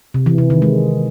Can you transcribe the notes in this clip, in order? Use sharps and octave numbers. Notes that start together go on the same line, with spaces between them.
C3
E3
C3
D#3
G#3